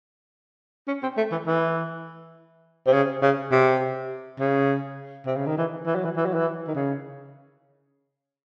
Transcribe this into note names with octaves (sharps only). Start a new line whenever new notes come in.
C#4
C4
A3
E3
E3
C3
C#3
C#3
C3
C#3
C3
C#3
D#3
E3
E3
F#3
E3
E3
F#3
E3
D#3
C#3